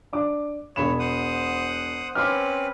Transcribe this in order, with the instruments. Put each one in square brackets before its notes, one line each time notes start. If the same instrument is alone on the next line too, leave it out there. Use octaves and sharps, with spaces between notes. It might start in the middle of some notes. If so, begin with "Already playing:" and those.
[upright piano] D4 D6
[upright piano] E1 B5 E7 [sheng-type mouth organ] C#5
[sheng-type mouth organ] C5 F#5 D#6
[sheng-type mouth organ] C4 C#4 B4 [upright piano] C6 D6 F6